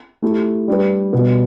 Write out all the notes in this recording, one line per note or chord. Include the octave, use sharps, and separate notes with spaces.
A3 E4 G4
G3 D4 G4 B4
B2 G3 B3